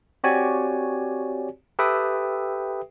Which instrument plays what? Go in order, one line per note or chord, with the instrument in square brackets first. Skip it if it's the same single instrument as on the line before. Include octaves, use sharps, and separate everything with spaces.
[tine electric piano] C4 F#4 G4 C#5 D5 G#5
G4 A4 B4 E5 G5 D#6